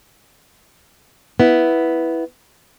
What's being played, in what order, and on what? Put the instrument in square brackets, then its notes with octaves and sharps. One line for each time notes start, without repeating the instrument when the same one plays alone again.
[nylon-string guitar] B3 E4